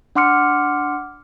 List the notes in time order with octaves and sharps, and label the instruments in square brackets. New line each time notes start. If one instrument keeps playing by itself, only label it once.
[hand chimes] D4 F#5 C6 D6 F6 C#7